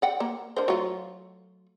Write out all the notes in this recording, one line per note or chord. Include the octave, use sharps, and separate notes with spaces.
D5 F#5 G5
A#3
D3 A#4 C5
F#3 A3 F4